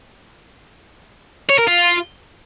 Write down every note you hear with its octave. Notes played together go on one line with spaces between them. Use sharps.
C#5
A#4
F4